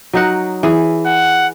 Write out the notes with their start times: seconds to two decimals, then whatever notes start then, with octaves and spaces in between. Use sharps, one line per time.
0.13 F#3 D#4 F#5
0.63 E3 G#4
1.06 F#5